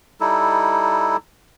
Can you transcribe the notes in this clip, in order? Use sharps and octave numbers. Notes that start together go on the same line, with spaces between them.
G3 D#4 E4 A4